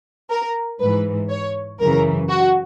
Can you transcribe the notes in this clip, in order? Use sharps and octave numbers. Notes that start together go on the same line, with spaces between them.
A#4
G#2 E3 B4
C#5
F#2 C#3 E3 A#4
F#4